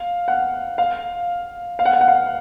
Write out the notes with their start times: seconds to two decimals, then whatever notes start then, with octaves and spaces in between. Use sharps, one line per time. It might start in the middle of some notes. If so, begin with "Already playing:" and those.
Already playing: F5
0.28 F#5
0.78 F5
1.79 F5
1.85 F#5
1.93 F5
2.01 F#5
2.08 F5